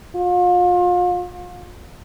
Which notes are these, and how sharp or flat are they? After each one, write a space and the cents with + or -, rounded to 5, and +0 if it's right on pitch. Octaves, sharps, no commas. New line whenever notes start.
F4 +35